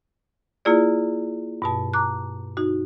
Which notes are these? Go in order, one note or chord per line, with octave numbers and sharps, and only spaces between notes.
A#3 E4 F4 G#4 D5
G2 B2 A5
A#5 D6 F#6
D#4 F#4